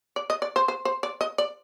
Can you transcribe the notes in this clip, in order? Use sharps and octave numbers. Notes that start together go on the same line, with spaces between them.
D5
D#5
D5
C5
C5
C5
D5
D#5
D5